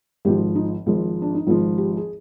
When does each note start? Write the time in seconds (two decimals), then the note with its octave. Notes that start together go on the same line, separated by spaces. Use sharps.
0.25 G#1 G#2 F3 G4
0.55 D#4
0.86 G#1 G#2 F3
1.22 D4
1.35 D#4
1.47 G#1 G#2 F3 F4
1.78 G4
1.97 G#4